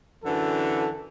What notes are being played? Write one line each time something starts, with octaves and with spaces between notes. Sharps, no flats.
F#2 D3 E3 A4